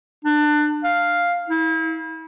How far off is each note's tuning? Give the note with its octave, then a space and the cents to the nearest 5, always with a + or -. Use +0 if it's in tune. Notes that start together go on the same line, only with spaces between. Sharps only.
D4 +25
F5 +0
E4 -35